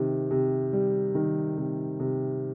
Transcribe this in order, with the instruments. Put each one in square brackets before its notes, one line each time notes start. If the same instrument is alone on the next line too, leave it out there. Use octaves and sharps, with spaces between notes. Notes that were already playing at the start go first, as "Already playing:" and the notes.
Already playing: [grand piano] C3 D#3
C3
G3
D#3
C3
C3